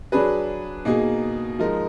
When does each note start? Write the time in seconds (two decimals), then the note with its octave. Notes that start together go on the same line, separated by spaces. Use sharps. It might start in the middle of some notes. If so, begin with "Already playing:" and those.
0.12 F#3 D4 G#4 B4
0.85 B2 A#3 D#4 G#4
1.59 F3 G#3 D#4 A#4